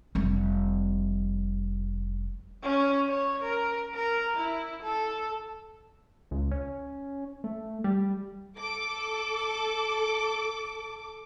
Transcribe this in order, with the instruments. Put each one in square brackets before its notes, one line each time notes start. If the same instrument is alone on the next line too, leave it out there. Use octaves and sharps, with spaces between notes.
[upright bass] F1 G3
[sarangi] C#4
C#5
A#4
A#4
E4
A4
[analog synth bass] C#2
C#4
A3
G3
[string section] A4 D6